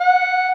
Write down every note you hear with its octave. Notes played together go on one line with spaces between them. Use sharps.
F#5